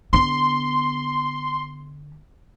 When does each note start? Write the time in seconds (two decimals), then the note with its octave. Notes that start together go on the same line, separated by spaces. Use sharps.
0.13 D3 B3 C6